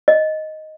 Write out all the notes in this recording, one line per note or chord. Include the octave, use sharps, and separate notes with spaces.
D#5